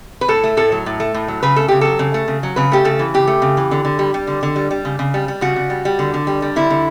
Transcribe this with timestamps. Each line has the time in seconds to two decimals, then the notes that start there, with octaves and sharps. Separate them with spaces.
0.21 B4
0.28 A2 A4
0.44 A3
0.57 A2 A4
0.72 F#3
0.86 A2
1.00 A3
1.14 A2
1.28 F#3
1.43 C#3 B4
1.56 A3 A4
1.68 C#3 G4
1.81 F#3 A4
1.99 C#3
2.14 A3
2.28 C#3
2.43 F#3
2.56 C#3 B4
2.72 A3 G4
2.85 C#3 A4
2.99 E3
3.14 C#3 G4
3.27 A3
3.42 C#3
3.57 E3
3.71 D3
3.85 D3
3.99 G3
4.14 G3
4.27 D3
4.43 D3
4.56 G3
4.71 G3
4.85 C#3
4.99 C#3
5.14 G3
5.28 G3
5.41 C#3 F#4
5.56 C#3
5.70 G3
5.85 G3
5.99 D3
6.14 D3
6.27 G3
6.42 G3
6.56 D3 E4
6.70 D3